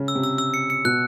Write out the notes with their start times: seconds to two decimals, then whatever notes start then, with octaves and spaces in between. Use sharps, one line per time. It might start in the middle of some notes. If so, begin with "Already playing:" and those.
Already playing: C#3
0.08 E6
0.15 C3
0.23 E6
0.38 E6
0.54 C#7
0.70 C#7
0.85 B2 F#6